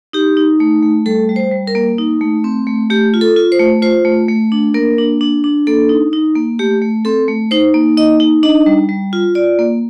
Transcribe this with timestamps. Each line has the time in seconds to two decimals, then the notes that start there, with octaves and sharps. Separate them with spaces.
0.13 D#4 G4
0.37 D#4
0.60 A3
0.83 A3
1.06 G3 A4
1.29 G3
1.36 C5
1.51 G3
1.67 A#4
1.75 A#3
1.98 D#4
2.21 A3
2.44 C4
2.67 A3
2.90 A3 G4
3.14 F4
3.21 A4
3.36 F4
3.52 C5
3.59 A3
3.82 F4 C5
4.05 A3
4.29 A3
4.52 D4
4.74 A#3 A#4
4.98 D4
5.21 D4
5.44 D4
5.67 A#3 A4
5.89 D#4
6.13 D#4
6.36 A#3
6.59 A3 G4
6.82 A3
7.05 C4 A4
7.28 A3
7.51 D#4 C5
7.74 A#3
7.97 D#4 D#5
8.20 D#4
8.43 D4 D#5
8.66 G3
8.89 G3
9.13 F4
9.35 F4 D5
9.59 A#3